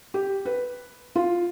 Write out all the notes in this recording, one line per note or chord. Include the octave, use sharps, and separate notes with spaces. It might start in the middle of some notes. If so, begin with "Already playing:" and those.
G4
B4
F4